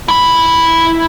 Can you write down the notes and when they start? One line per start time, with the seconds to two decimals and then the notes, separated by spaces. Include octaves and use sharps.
0.08 E4 B5